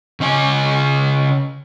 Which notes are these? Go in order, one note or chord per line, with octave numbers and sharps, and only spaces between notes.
C#3 C#4 D#5 G#5